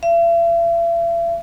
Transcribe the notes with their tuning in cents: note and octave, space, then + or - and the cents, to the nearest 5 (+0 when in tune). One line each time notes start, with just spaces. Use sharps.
E5 +45